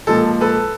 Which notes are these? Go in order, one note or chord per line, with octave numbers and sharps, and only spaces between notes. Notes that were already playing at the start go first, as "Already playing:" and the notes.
A#2 F3 G#3 A4
A4 B4